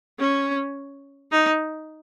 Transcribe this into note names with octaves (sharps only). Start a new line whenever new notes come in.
C#4
D#4